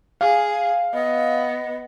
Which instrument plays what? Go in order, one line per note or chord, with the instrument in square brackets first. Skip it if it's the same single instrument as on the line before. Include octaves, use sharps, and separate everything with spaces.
[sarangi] G#4 [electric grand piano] F5
[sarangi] B3 [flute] D#5